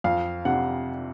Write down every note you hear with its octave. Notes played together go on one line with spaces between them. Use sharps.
F2 F5
C3 F#5